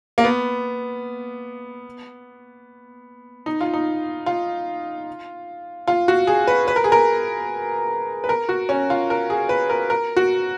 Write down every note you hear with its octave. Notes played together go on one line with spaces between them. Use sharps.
A#3
B3
D#4
F4
D#4
F4
F4
F#4
G#4
B4
B4
A#4
G#4
A#4
B4
A#4
F#4
C#4
F4
A#4
G#4
B4
A#4
A#4
F#4